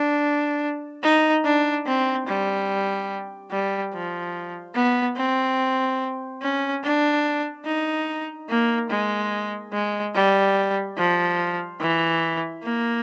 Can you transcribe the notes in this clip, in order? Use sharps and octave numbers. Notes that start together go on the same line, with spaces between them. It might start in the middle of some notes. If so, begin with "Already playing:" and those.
Already playing: D4
D#4
D4
C4
G3
G3
F3
B3
C4
C#4
D4
D#4
A#3
G#3
G#3
G3
F3
E3
A#3